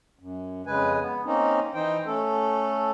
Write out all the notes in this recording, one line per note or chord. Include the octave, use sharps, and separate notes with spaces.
F#2
F2 C#3 G#3 B4 G#5
B3
A#3 C4 C#4 D#4
E3 D#4 C5 G5
A3 C#4 A4